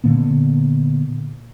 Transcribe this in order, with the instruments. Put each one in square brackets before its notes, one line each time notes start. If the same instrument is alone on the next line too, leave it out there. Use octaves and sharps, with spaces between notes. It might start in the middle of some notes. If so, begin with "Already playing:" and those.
[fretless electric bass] A#2 D3 A#3 B3